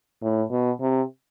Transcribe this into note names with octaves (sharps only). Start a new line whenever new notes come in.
A2
B2
C3